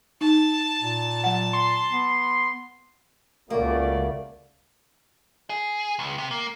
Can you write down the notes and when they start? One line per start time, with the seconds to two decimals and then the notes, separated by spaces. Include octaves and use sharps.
0.21 D#4 A5
0.81 A#2
1.24 F#3 F#5
1.53 C6
1.91 B3
3.50 C#2 C#3 A3 A#3 F#4 D5
5.50 G#4
5.99 C#2
6.18 C3
6.31 A#3